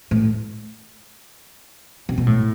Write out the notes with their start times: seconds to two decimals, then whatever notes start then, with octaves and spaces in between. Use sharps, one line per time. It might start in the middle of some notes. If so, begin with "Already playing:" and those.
0.11 A2
2.09 C3
2.18 B2
2.27 A2